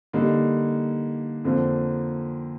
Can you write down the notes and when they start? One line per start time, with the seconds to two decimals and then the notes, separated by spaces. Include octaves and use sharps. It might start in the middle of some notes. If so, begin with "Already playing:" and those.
0.13 D3 G3 A#3 D#4
1.44 F2 D3 F3 A#3